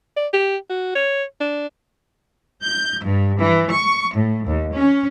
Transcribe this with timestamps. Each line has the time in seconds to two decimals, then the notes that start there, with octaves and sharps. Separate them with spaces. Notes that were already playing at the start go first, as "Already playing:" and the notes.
0.16 D5
0.33 G4
0.70 F#4
0.95 C#5
1.40 D4
2.63 G6
3.02 G2
3.37 E3
3.69 C#6
4.14 A2
4.45 D#2
4.75 C#4